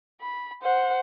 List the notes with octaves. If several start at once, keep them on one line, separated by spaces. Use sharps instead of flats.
B5
C5 F#5